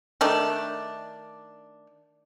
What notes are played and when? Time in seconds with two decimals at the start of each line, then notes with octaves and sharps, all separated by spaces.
0.21 D#3 A3 D4